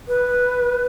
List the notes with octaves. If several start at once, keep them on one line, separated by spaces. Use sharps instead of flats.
B4